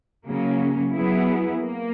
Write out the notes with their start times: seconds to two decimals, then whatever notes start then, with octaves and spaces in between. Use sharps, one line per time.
0.25 C#3 F#3 A#3 C#4
0.94 F#3 B3 E4 G#4
1.62 A#3